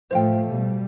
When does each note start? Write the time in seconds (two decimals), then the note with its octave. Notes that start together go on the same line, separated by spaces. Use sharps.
0.11 A2 F3 A3 C5 F5 G5
0.48 B2 G3